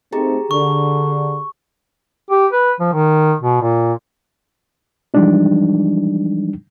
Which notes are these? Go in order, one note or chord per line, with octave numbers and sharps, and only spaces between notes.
A3 C4 D#4 G4 G#4 A#5
D3 C#6
G4
B4
F3
D#3
B2
A#2
E3 F3 G3 G#3 D4 D#4